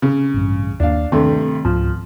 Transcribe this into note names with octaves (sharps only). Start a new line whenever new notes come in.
C#3
A1 G2
D#2 A#3 D4 F5
G2 C3 D#3 A3
C#2 G#2 F3